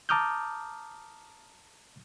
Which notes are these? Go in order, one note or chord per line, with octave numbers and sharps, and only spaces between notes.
A5 A#5 D6 D#6 F6 G6